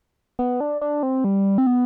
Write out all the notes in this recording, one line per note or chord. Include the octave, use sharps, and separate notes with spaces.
B3
D4
D4
C4
G3
C4
B3